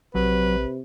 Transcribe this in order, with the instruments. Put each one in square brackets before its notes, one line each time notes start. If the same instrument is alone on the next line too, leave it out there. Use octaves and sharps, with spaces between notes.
[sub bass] A#1 [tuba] C3 [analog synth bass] F#3 [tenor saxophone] B4